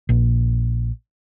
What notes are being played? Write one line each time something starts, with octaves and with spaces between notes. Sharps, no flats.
A#1